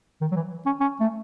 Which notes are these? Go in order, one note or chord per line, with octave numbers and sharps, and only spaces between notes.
D#3
F#3
E3
C#4
C#4
A3